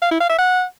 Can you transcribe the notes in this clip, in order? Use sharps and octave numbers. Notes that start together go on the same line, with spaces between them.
F5
E4
F5
E5
F#5